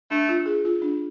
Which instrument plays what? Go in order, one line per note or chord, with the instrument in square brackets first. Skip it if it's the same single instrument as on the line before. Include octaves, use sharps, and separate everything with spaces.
[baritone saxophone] A3 [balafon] D4
[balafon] F4
G#4
F4
D4